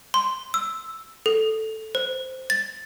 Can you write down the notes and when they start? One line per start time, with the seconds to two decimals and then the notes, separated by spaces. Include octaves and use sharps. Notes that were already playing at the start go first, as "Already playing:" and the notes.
0.14 C6
0.54 E6
1.26 A4
1.95 C5
2.50 A6